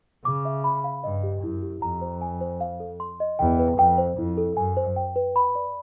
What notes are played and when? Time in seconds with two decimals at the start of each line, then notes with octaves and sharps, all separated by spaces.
0.25 C#3 D6
0.45 E5
0.64 B5
0.84 F5
1.04 G2 D#5
1.23 G4
1.43 F#2 E4
1.62 G4
1.82 F2 A#5
2.01 C5
2.21 G#5
2.41 C5
2.61 F5
2.80 A4
3.00 C6
3.20 D#5
3.39 E2 G5
3.59 B4
3.78 F2 G5
3.98 C5
4.18 F2 E4
4.37 A4
4.57 F#2 G#5
4.77 C5
4.96 G5
5.16 B4
5.36 B5
5.55 D5